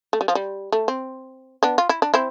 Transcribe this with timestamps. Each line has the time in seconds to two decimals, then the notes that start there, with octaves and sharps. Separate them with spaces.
0.13 A3
0.21 G3
0.28 F3
0.35 G3
0.72 A3
0.88 C4
1.63 B3 D4
1.78 F4
1.89 E4
2.02 D4
2.14 C4 E4